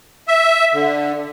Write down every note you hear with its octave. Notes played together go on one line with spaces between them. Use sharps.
E5
D3